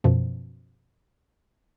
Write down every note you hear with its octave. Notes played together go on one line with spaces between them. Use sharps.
F#2 B2 F3